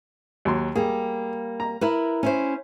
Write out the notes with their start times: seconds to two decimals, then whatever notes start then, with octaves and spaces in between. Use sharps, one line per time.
0.45 D#2 F#3 C6
0.75 G3 A#3 G#4
1.60 A#5
1.81 E4 A#4 B4
2.23 C#4 E4 C5